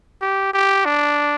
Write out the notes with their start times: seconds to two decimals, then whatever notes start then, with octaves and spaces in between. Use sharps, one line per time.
0.21 G4
0.53 G4
0.85 D4